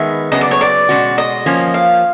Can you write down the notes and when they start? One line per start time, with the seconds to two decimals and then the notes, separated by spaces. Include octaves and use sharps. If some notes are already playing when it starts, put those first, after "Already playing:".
Already playing: D#3 G#3 B3 E5
0.32 C#3 F#3 B3 D#5
0.41 D5
0.51 C#5
0.61 D5
0.89 B2 G#3 C#4 F#4
1.18 D#5
1.46 F3 A#3 C#4
1.74 F5